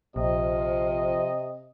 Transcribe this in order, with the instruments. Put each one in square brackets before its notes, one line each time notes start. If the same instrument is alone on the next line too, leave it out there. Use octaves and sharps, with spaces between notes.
[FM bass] A#1 [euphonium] C3 [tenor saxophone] F3 [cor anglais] D#5